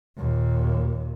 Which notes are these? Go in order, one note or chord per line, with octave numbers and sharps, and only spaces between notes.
D#2 A#2